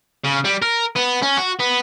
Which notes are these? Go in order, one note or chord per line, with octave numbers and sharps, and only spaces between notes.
C#3
G3
A#4
B3
C#4
F#4
B3